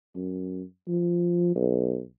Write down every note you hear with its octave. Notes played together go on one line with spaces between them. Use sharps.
F#2
F3
B1